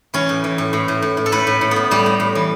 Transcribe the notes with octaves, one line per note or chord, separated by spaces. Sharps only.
E3 C#4
A2
E3
A2
A2
A2
A2
A2
A4
A2 B4
A2
A2
A2 B3
A2 G3
A2
A2
E3